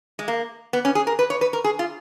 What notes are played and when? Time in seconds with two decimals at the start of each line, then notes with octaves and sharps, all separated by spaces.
0.19 G#3
0.28 A#3
0.73 B3
0.85 C#4
0.95 G#4
1.07 A#4
1.19 B4
1.30 C#5
1.41 B4
1.53 A#4
1.64 G#4
1.79 F4